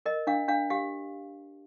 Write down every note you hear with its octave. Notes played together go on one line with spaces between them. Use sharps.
A#4 D#5
D4 F5
D4 F5
G4 F5